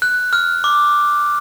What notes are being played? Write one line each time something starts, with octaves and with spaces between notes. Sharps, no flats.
F#6
F6
D6